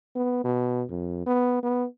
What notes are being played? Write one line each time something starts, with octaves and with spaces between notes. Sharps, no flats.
B3
B2
F2
B3
B3